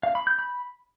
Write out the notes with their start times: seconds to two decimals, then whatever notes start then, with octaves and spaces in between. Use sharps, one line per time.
0.03 F5
0.15 B5
0.27 G6
0.39 B5